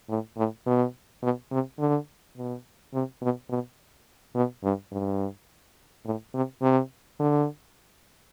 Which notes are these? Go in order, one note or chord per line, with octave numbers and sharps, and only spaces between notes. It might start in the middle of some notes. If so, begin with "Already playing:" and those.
A2
A2
B2
B2
C3
D3
B2
C3
B2
B2
B2
G2
G2
A2
C3
C3
D3